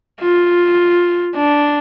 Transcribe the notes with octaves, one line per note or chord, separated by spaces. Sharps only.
F4
D4